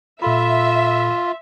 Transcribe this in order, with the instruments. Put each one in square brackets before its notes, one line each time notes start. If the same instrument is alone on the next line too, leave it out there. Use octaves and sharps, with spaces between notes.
[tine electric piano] A#2 A4 B5 [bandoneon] F4 [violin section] E5